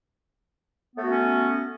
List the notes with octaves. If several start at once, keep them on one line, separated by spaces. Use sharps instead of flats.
A3 B3 C#4 F#4